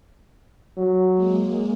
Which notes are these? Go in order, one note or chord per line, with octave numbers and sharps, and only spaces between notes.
F#3
G#3 A#3